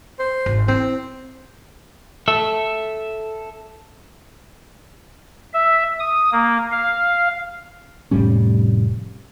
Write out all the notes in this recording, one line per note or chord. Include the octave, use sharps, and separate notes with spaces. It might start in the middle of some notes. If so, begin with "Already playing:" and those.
C5
G#1
C4 E4
A4 E5
E5
D#6
A#3
F5
F1 A2 G3 C#4